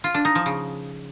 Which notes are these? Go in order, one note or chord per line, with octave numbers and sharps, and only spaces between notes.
F4
D4
D#4
F3
C#3